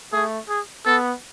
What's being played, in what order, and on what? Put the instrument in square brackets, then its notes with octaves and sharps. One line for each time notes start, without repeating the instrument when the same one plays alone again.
[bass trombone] A3 [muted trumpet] G#4
[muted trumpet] G#4
[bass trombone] B3 [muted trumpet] A4